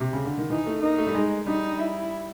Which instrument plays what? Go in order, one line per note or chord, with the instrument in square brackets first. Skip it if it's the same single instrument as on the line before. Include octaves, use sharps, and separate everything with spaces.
[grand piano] C3
C#3
D3
D#3
[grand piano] E3 [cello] D#4
[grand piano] A3
[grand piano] A#3 [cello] D#4
[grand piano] A3
G3
G#3
[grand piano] G3 [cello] D#4
[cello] E4